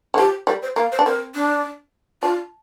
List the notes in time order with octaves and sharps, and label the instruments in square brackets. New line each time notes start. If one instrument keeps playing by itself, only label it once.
[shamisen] D3
[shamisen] F3 [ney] G4
[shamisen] G3 [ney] A#4
[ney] C5
[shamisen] A#3 [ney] F5
[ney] C5
[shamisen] D4
[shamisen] C4 [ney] A#4
[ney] D4
[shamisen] D4 [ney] F4